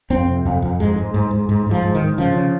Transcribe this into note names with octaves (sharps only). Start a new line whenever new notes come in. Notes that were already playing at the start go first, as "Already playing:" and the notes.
F2 C4
C3
F2
F2
G#2 G#3
G#2
G#2
G#2
G#2
G#2 F3
G#2
D#3
G#2
C#3 F3
C#3